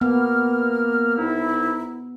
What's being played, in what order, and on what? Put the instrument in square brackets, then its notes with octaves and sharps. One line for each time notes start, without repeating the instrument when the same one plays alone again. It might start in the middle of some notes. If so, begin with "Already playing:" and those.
[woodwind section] A#3 F6 [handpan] B3
[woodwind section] C2 D#4 E4